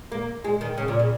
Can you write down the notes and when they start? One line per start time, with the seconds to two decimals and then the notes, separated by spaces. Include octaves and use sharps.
0.12 A#3
0.44 G#3
0.61 D#3
0.78 C#3
0.88 A#2
0.99 C#3